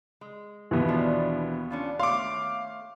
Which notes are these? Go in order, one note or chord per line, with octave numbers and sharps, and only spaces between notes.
G#3
D#2 B2 E3 B3
F3 D4
C#4 D4 F4
A3 C#5 F5 C6 D6